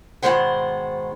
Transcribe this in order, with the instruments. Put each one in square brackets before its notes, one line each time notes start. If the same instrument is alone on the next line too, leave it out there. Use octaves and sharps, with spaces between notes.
[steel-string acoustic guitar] G#2 B2 D#3 G#3 C5 F#5